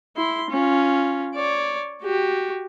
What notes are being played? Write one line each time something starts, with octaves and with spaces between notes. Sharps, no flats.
E4 C6
C#4 F4
C#5 D5
F#4 G4